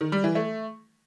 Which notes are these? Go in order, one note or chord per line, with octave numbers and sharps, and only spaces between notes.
D#3
G3
E3
A3